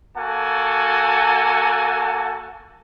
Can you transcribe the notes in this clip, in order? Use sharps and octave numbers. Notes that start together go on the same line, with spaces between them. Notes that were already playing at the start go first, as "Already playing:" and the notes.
A#3 F#4 A4 F#5 G#5 A5